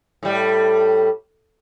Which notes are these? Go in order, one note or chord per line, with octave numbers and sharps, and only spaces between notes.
A2 G3